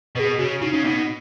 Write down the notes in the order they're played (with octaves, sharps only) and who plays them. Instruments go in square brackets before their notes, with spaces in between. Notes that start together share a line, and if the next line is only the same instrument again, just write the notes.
[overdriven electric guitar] B2 [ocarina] B4
[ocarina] G#4
[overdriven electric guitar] C#3 [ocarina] F#4
[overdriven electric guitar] C#3 [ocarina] D#4
[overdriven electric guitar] C#3
[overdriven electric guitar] B2 [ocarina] D#4